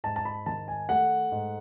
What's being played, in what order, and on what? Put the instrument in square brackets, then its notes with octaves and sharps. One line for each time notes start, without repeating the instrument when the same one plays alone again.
[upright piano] G#2 A5
A5
B5
D#3 A5
G#5
A3 F#5
G#2